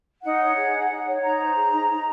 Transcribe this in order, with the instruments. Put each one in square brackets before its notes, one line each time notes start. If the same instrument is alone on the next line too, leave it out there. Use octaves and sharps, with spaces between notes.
[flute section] D#4 F#5
C#5
G#4
D#4
D#4
C#5
D#4 A#5
C5
G#4
D#4
D#4